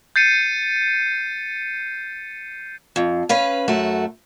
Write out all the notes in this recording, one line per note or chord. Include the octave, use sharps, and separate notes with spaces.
G6 A6 C7 C#7 D#7
F2
C#4 B4 F5
F#2 A3 F#4